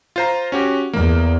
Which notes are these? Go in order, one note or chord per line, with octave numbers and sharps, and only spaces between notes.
F4 C5 A#5
C#4 F#4 G4
E2 A#3